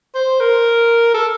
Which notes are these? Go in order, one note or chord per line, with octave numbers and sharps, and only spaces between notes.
C5
A#4
A4